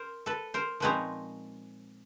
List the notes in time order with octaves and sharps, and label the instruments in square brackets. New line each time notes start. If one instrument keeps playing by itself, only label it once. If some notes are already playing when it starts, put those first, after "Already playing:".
Already playing: [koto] A#4 C5
A4 B4
A#4 C5
A#2 F3 G#3 C4 D#4 B4 C#5